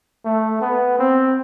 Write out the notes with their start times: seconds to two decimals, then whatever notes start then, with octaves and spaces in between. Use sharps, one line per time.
0.25 A3
0.61 B3
0.98 C4